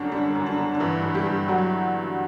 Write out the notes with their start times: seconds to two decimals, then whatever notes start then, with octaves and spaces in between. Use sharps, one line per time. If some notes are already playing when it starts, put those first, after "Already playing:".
Already playing: F#2 D3 G3 C#4 D4
0.12 G3 D4
0.35 F#2
0.46 D4
0.57 D3
0.75 D4
0.80 G2 E3 E4
1.03 G2
1.14 G3 G4
1.27 G2
1.48 F#3 F#4